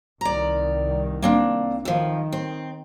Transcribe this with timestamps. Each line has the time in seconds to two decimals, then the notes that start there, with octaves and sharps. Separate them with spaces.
0.21 C2 D#3 D5 A#5
1.22 A#3 C4 D4
1.85 F2 D#3 F3
2.32 C4